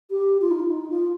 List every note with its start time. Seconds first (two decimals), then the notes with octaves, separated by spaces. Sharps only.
0.11 G4
0.41 F4
0.51 D#4
0.60 F4
0.70 D#4
0.90 F4